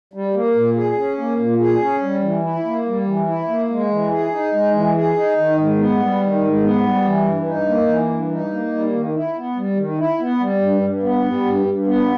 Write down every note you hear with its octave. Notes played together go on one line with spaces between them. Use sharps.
G3
A#3
A#2
G#4
C#4
A#3
A#2
G#4
C#4
G3
E3
E4
A#3
G3
E3
E4
A#3
G#3
E3
G#4
D#4
G#3
E3
G#4
D#4
D#3
G#2
B3
G3
D#3
G#2
B3
G3
E3
G2
D#4
A#3
E3
G2
D#4
A#3
G3
D#3
E4
B3
G3
D#3
E4
B3
G3
G2
G2
B3
G3
G2
G2
B3